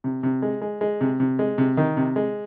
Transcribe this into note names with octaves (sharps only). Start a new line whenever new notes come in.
C3
C3
G#3
G#3
G#3
C3
C3
G#3
C3
D#3
C3
G#3